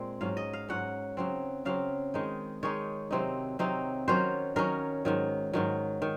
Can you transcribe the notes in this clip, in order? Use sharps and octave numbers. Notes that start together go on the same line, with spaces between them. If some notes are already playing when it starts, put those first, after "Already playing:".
Already playing: A#2 G#3 C4
G#2 F#3 C#4 F5
D#5
F5
G#2 F#3 C#4 F#5
C#3 F#3 C4
C#3 F#3 C4 F5
D#3 G#3 D#4
D#3 G#3 D#4 C#5
C3 F#3 C4 D#4
C3 F#3 C4 D#4
D#3 F#3 C#4 C5
D#3 F#3 C#4 A#4
G#2 D#3 F#3
G#2 D#3 F#3
D#3